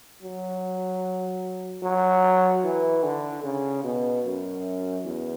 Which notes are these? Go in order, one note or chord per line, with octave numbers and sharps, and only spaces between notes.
F#3
F#3
E3
D3
C#3
B2
F#2
E2